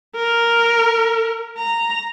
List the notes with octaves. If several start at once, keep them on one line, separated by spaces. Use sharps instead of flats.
A#4
A#5